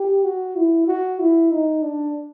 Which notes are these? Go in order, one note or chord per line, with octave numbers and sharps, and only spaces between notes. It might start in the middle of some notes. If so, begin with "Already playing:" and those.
Already playing: G4
F#4
E4
F#4
E4
D#4
D4